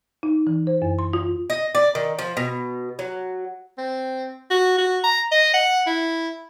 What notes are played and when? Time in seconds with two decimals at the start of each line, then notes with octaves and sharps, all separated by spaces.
0.23 D#4
0.47 E3
0.67 C5
0.82 F#2
0.99 C6
1.13 F4
1.50 D#5
1.75 D5
1.95 D#3
2.19 F3
2.37 B2
2.99 F#3
3.78 C4
4.50 F#4
4.78 F#4
5.04 A#5
5.32 D#5
5.54 F#5
5.87 E4